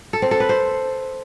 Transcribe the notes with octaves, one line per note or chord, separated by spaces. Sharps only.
A4
C4
A4
B4
C5